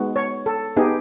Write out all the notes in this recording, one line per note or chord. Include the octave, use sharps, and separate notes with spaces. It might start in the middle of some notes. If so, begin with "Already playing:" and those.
Already playing: G#3 B3 D#4 F#4
C#5
A4
B3 D#4 G4 G#4